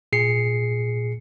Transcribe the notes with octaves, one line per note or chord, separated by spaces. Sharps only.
A#2 G#4 C7 C#7